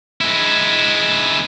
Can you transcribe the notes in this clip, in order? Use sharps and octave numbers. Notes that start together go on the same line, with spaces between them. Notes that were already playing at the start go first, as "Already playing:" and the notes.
G#3 E4